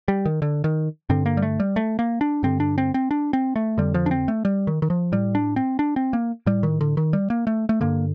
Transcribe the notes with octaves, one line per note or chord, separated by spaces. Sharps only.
G3
D#3
D3
D#3
G2 D3 C4
A#3
G3
A3
G3
A3
A#3
D4
G2 D3 C4
D4
C4
C4
D4
C4
A3
F2 D3 G3
F3
D4
C4
A3
G3
D#3
D#3
F3
A2 G3
D4
C4
D4
C4
A#3
A2 G3
D#3
D3
D#3
G3
A#3
A3
A3
G2 D3 A#3